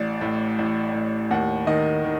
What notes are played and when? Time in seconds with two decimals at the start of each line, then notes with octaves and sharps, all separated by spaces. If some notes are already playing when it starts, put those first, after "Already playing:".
Already playing: A1 D5
0.21 A2
0.59 A1
0.94 A2
1.31 D#2 F#5
1.67 D#3 D#5
2.04 D#3